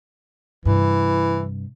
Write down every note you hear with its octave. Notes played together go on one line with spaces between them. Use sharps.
G2 C3 E3